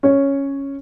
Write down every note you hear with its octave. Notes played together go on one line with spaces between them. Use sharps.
C#4 C#5